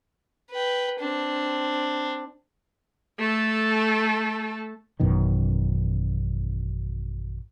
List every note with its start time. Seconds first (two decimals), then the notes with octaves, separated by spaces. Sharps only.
0.51 B4 G5
1.00 C4 D4
3.19 A3 A4
5.00 A1 F#2 B2 D#3